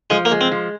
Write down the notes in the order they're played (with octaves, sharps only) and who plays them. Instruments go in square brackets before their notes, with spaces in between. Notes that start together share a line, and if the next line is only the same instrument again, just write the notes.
[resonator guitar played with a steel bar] F3 [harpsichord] G#3
[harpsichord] A#3
[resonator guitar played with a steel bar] G#3
[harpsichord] C4
[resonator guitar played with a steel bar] F3